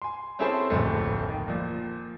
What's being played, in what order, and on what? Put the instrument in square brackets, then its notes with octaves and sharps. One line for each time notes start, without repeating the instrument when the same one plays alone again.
[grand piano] G#5 C6
C4 C#4 E4 G#4 A4 C5
D1 A#1 F2 A3
D#3
A#2 F3